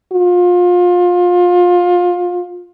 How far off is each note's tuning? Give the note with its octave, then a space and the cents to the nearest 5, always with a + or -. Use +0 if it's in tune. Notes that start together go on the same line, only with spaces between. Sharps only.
F4 +25